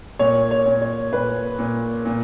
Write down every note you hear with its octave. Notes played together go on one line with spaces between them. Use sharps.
A#2 C#5
C#5
A#2
C#5
A#2 B4
A#2
A#2